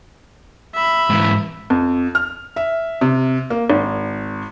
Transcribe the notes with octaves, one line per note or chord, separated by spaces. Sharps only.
E5 B5
G#2 E3
F2
F6
E5
C3
A#3
G#1